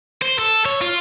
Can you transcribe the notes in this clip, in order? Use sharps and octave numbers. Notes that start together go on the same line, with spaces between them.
C5
A4
C#5
F4